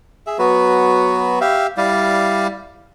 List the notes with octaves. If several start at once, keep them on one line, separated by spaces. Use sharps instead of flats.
G#4 E5
F#3 B3 F#4 B4
G4 E5 F5
G3 E4 D5 F5